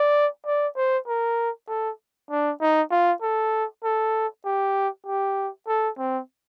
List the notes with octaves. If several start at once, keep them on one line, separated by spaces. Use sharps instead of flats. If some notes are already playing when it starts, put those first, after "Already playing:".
Already playing: D5
D5
C5
A#4
A4
D4
D#4
F4
A4
A4
G4
G4
A4
C4